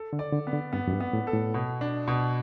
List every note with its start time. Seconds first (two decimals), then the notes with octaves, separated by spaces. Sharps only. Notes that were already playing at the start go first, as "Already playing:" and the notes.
Already playing: A4
0.13 D3
0.19 D5
0.32 D3
0.47 B3
0.53 D3
0.73 G2 B3
0.88 F#2
0.93 G2
1.01 B3
1.13 A2
1.27 A4
1.33 A2
1.54 B2
1.81 D4
2.08 B2